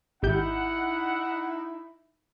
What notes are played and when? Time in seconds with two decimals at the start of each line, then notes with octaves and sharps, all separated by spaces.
0.23 G#1 D#4 E4 G4 F#5 G6